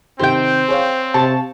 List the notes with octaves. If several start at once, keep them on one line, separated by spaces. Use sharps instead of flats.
C3 D#3 C4 G4 C5 G5
G#4 C#5 F5
C3 A5 C#6